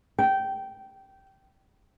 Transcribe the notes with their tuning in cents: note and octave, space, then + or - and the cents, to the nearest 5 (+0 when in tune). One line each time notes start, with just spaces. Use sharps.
G5 -15